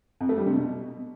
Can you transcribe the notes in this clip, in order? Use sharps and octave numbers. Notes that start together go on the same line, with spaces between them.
F2
A3
G3
C3
B2